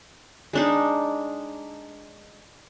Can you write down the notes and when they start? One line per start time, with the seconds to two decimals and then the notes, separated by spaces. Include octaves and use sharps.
0.53 G#3 D4 D#4